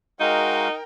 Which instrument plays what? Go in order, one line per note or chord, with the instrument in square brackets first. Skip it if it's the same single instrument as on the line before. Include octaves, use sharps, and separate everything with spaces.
[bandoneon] G#3 F#4 F5 [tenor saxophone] D#4 [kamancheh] A#4 G5